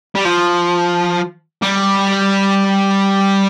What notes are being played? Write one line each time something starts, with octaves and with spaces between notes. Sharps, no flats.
G3
F3
G3